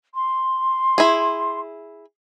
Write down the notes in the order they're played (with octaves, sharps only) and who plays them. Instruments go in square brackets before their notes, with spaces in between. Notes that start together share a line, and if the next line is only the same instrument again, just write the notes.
[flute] C6
[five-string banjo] E4 G#4